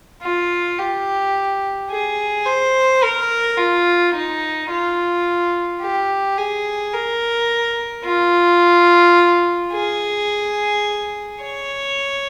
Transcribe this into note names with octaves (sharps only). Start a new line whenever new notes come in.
F4
G4
G#4
C5
A#4
F4
D#4
F4
G4
G#4
A#4
F4
G#4
C#5